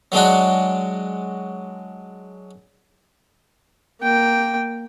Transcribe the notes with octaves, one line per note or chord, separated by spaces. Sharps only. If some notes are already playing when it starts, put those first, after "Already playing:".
F#3 G#3 D4 F#4
A#3 G5